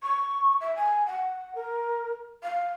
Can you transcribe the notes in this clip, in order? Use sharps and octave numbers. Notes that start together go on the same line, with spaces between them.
C#6
E5
G#5
F#5
A#4
F5